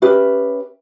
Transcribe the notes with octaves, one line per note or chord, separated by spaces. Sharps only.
C#4 G4 B4 E5